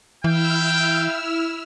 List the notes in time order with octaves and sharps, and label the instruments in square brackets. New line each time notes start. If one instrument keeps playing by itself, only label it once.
[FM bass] E3 [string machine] E4 E6 F6 [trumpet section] F5 G5